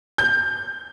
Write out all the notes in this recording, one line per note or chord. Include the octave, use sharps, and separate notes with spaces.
G6